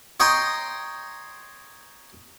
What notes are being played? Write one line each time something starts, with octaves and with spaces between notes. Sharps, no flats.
C#5 D#5 G5 A#5 C6 D#6